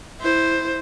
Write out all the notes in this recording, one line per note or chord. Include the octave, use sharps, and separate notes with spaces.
E4 C5